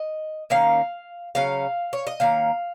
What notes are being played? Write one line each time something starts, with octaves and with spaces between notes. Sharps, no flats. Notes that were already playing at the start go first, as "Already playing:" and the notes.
Already playing: D#5
D#3 A#3 C#4 F5
C#3 F#3 C#4 F5
C#5
D#5
D#3 A#3 C#4 F5